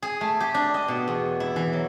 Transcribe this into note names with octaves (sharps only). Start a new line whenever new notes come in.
G#4
A3
G4
D4
D#5
B2
E2
E4
E3
F#3